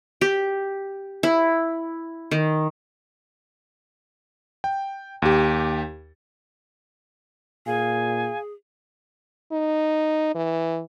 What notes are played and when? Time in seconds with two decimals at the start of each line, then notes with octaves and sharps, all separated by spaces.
0.21 G4
1.23 E4
2.31 D#3
4.64 G5
5.22 D#2 G4
7.66 A#2 G#4 F5 G#5
9.52 D#4
10.35 E3